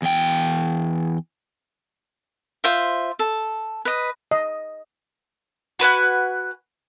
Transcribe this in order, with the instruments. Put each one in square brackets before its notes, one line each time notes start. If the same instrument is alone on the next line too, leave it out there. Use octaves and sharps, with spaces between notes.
[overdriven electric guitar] E2 G5
[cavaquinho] F4 C5 E5
A4
B4 D#5
[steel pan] D#5
[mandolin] F#4 B4 F#5 G#5